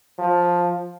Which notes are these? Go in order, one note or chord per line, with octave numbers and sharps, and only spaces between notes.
F3